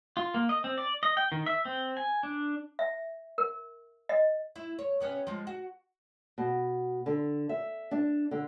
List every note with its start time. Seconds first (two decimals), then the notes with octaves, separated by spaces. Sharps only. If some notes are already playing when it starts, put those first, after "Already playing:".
0.17 F4
0.34 A#3
0.49 D#5
0.64 C4
0.78 D5
1.03 D#5
1.17 G5
1.32 D#3
1.46 E5
1.65 C4
1.97 G#5
2.23 D4
2.79 E5
3.38 A#4
4.09 D#5
4.56 E4
4.79 C#5
5.00 C3 B3 C#4
5.27 F3 G#3
5.47 F#4
6.38 B2
7.06 D3
7.49 E5
7.91 D4
8.31 D3